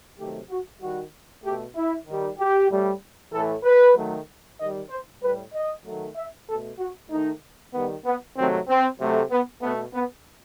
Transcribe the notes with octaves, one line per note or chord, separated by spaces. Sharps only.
C3 D#3 F#3 A3 G4
F#4
D#3 G3 F#4
B2 A3 G4
E4
D#3 G3
G4
A2 G3
A2 E3 A3 A4
B4
D#3 F#3 A3
D#3 G3 D#5
C5
A2 G3 B4
D#5
D#3 F#3 A3
E5
B2 A3 A4
F#4
D#3 A3 D#4
D#3 G3 B3
B3
C3 D#3 F#3 A3 C4
C4
C3 F#3 A3
B3
B2 A3 B3
B3